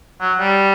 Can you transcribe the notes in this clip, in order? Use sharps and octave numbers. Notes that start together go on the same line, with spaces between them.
F#3
G3